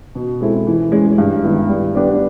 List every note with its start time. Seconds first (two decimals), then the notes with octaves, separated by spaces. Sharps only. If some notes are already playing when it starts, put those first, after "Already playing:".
0.15 B2
0.41 G#3 C4 E4 A4
0.67 E3
0.92 G#3 C#4
1.18 G2
1.44 D#3 G#3 B3 E4
1.69 G3
1.95 B3 D4 G4 B4